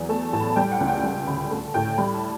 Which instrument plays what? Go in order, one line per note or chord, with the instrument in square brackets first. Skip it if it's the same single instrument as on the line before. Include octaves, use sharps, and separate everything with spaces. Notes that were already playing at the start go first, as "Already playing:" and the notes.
Already playing: [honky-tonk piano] E2 F#3
A3 A5
A2 A5
B5
G3 G5
F#5
C#2
G5
G3 G5
D2 B5
A3 A5
A2 G5
G3 B5
A5